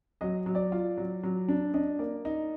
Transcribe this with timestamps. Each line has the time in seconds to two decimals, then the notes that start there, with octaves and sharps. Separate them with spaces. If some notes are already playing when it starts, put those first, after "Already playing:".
0.21 F#3 D#5
0.46 F#3
0.55 D5
0.72 F4
0.97 F#3
1.23 F#3
1.48 D4
1.74 D4 D#5
1.99 A#3 D5
2.25 D#4